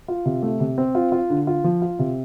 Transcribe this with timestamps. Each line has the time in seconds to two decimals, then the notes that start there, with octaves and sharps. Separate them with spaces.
0.08 F4
0.25 C3
0.43 A3
0.60 C3
0.78 C4
0.95 F4
1.12 F4
1.30 D3
1.47 F4
1.64 F3
1.82 F4
1.99 C3